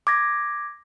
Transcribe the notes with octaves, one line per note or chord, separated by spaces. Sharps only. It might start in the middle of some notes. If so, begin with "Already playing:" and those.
D6 G#6 A#6